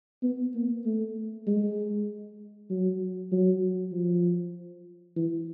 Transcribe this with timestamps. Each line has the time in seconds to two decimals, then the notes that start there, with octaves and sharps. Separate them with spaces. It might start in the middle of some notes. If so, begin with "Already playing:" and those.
0.23 B3
0.55 A#3
0.85 A3
1.47 G#3
2.70 F#3
3.32 F#3
3.92 F3
5.16 E3